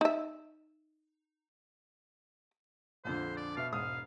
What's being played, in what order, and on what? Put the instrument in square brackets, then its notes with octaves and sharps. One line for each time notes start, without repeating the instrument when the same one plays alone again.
[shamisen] D#4 E5
[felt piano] A#1 F2 D3 [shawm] C5
[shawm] D5
[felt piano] B2 E5 [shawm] F5
[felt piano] E1 G#2 D#6 [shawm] F5